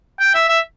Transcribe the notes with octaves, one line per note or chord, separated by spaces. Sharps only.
G5
E5
E5